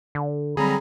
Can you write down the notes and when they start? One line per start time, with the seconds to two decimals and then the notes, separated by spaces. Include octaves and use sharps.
0.15 D3
0.57 D3 F#3 G3 C4 G#4 A#5 B5